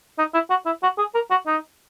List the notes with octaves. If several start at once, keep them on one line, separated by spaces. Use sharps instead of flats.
D#4
E4
F#4
E4
F#4
G#4
A#4
F#4
D#4